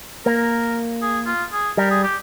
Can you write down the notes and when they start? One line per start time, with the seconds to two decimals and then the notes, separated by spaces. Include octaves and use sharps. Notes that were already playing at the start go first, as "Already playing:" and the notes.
0.25 A#3 A#4
1.02 G#4
1.27 F4
1.53 G#4
1.77 G3 A#4
1.91 G#4
2.04 G4